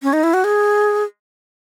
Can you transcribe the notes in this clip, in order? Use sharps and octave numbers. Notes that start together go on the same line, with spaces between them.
C#4
D#4
E4
F#4
G#4